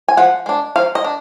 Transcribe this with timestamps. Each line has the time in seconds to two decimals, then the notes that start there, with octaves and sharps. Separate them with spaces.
0.08 G#5
0.17 F3 F#5
0.46 G#3 D4
0.76 F3 F5
0.95 D#5
1.04 D4